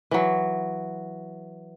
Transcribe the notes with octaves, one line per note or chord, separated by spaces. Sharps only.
E3 F#3